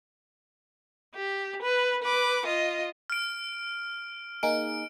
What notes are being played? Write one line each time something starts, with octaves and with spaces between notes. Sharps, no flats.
G4
B4
B4 D6
F4 D#5
F6 D7
A#3 D#4 G#4 D7